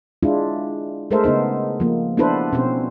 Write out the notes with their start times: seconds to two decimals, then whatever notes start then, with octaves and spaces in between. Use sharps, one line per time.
0.23 G#3 D4 E4 F4
1.11 G#3 A3 A4 A#4 C5 E5
1.24 C#3 B3 D#4 C5
1.80 F3 A#3
2.17 B3 D4 E4 A4 B4 C5
2.53 B2 C4 C#4 C5